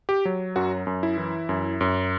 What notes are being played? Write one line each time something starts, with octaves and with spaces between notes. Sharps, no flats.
G4
F#3
F#2 F#4
F#2
E4
E3
F#2
F#2